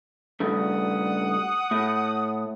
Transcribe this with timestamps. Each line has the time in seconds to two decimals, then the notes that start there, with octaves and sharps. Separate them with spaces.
0.40 G2 C#3 A3 F#5 D#6
1.71 A2